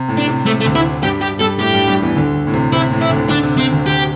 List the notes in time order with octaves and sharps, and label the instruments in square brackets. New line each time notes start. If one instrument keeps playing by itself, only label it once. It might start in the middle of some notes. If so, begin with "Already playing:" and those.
Already playing: [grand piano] C3
A2
[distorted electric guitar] D4
[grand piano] C3
[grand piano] C3 [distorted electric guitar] A3
[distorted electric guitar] A3
[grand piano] D2 D3
[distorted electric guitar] E4
[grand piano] G2 G3 [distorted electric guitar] G4
[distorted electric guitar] G4
[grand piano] G2 G3 [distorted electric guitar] A4
[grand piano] A2 A3 [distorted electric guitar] G4
[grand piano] G2 G3
G2 G3
E2 E3
D2 D3
A2
C3
[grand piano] C3 [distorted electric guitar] E4
[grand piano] A2
[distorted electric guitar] E4
[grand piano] D2 D3
[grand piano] D2 D3 [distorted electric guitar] D4
[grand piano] C3
[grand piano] C3 [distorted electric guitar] C4
[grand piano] D2 D3
[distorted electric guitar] G4